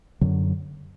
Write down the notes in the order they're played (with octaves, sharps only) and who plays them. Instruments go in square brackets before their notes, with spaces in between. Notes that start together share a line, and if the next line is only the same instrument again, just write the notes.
[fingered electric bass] F#2 D3 F#3